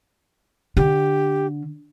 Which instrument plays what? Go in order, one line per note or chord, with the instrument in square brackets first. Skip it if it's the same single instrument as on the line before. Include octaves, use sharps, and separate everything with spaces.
[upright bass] D3 [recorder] G4